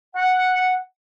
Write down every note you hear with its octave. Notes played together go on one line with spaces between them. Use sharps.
F#5